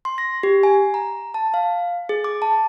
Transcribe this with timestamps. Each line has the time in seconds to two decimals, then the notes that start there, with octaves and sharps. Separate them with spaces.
0.05 C6
0.18 A#6
0.43 G4
0.63 G#5
0.94 A#5
1.34 A5
1.54 F5
2.09 G#4
2.24 D6
2.42 A5